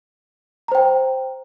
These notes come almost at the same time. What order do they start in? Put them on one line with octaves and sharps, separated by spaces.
A#5 C5 G5